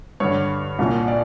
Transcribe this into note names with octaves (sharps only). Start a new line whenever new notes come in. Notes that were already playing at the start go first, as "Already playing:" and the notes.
G2 D3 C#5
C2 A#2
D5